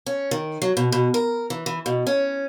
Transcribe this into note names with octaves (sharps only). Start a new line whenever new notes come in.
C#4
D#3
F#3
B2
B2
A#4
E3
E3
B2
C#4